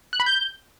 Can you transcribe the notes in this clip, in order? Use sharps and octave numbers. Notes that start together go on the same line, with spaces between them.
F#6
B5
G6